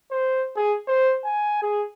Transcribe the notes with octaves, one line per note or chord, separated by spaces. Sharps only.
C5
G#4
C5
G#5
G#4